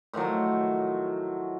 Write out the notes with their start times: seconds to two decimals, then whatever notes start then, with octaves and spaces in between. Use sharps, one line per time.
0.13 A2 D#3 F3 F#3